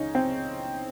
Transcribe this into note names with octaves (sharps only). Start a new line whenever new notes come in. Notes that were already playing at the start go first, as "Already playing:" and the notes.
Already playing: C#2 C#3 C#4 D#4
C4